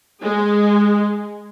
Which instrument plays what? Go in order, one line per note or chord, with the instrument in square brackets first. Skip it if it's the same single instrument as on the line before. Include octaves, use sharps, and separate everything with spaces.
[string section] G#3